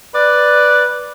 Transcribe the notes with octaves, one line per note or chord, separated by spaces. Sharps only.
B4 D5